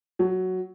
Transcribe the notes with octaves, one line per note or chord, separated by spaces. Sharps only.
F#3